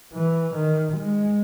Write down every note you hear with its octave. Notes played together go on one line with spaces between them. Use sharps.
E3
D#3
G#3